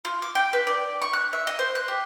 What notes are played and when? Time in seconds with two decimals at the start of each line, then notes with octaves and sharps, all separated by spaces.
0.05 F4
0.22 D6
0.35 G5
0.53 B4
0.67 D5
1.02 C#6
1.13 F#6
1.33 E5
1.47 D#5
1.59 C5
1.75 F#6
1.88 G4